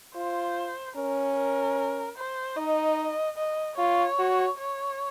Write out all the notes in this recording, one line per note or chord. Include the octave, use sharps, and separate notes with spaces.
F4 C5
C#4 A#4
A#4
C5
D#4 D#5
D#5
F4 C#5
F#4
C#5